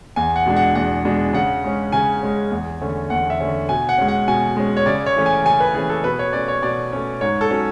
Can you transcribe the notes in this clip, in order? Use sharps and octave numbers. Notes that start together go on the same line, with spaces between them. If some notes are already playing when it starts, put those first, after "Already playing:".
E2 G#5
F#5
B2 G#3 D4
F#5
E2 F#5
B2 G#3 D4
C#3 F#5
G#3 C#4
C#3 G#5
G#3 C#4
E2
D3 A3 C#4
E2 F#5
E5
D3 A3 C#4
B2 G#5
F#5
G#3 C#4
F#5
B2 G#5
G#3 C#4
C#5
C#3 D5
C#5
E3 A3 C#4
G#5
C#3 G#5
B4
E3 A3 C#4 G#4
A4
B2 B4
C#5
A3 C#4 D5
C#5
B2 D5
A3 C#4
G#2 C#5
A4
F#3 C#4